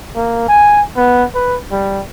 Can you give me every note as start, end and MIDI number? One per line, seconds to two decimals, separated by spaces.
0.15 0.46 58
0.49 0.81 80
0.96 1.24 59
1.35 1.58 71
1.71 2.02 55